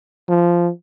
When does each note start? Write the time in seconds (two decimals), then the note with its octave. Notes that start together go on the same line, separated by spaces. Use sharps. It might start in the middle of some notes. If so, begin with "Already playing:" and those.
0.28 F3